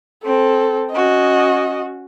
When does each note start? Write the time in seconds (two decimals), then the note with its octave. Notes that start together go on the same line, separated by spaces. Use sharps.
0.24 C4 A4
0.92 C#4 F#4 D#5